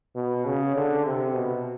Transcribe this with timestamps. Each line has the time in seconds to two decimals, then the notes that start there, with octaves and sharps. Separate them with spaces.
0.16 B2
0.45 C#3
0.76 D3
1.06 C3
1.35 B2